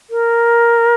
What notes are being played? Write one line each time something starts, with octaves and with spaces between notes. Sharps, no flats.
A#4